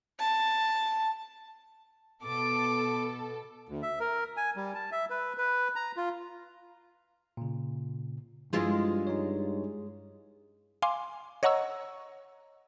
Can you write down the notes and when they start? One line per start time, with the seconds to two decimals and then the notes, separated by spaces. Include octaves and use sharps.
0.19 A5
2.24 B2 B3 A4 D6
3.69 D2
3.83 E5
4.00 A#4
4.37 G#5
4.56 G3
4.74 A5
4.92 E5
5.10 B4
5.38 B4
5.76 A#5
5.97 F4
7.37 A#2 C#3
8.53 G2 F3 G#3 E4 F4
9.07 D#4 C#5
10.82 F5 G#5 C6 D6
11.43 C#5 D#5 F#5 A#5 C#6 E6